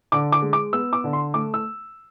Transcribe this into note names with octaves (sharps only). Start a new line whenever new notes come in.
D3 D6
D6
G#3
D6
B3 E6
D6
D3
C6
A3 D6
E6